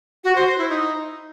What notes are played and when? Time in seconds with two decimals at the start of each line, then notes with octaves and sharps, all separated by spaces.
0.24 F#4
0.35 C5
0.47 C5
0.58 E4
0.69 D#4